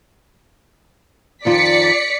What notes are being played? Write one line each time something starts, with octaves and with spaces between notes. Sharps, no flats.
F2 D#3 F4 D5 B6 C#7